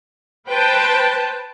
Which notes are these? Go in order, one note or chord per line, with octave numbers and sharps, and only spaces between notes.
B4 C5 G5 A5